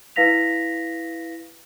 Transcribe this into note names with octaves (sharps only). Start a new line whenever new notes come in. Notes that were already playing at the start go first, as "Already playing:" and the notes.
E4 B4 F5 A#6 B6 F7